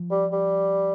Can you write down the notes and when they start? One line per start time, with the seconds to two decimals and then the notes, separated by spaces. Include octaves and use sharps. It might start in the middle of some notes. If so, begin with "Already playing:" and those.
Already playing: F3
0.11 G3
0.33 G3